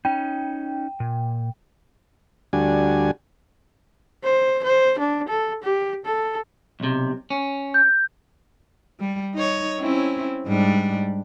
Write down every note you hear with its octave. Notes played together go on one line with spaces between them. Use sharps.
C#4 D#4 G5
A#2
D2 G3 D4 F#4 G#5
C5
C5
D4
A4
G4
A4
B1 C3
C#4
G6
G3
D#4 C#5
C4 C#4 E4
G#2 G3 D4